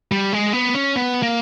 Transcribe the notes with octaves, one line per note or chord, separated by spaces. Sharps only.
G3
G#3
B3
C#4
B3
A#3